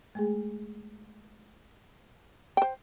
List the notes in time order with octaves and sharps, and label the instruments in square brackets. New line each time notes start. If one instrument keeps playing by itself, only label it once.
[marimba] G#3 A3 G#4
[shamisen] C5 G5